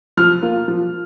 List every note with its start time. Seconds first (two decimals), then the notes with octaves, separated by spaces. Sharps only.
0.17 F3 F6
0.42 A#3 F4
0.68 F3